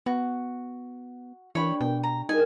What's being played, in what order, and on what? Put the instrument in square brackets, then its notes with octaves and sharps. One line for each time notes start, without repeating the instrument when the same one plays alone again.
[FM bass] B3 [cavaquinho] F#4
[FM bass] E3 [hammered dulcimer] D4 G4 [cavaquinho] C#5 B5
[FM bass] B2 [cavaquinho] G5 [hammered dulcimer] C#6
[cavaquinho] A#5
[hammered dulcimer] G3 G#4 A#4 [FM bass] D#4 [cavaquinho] G#5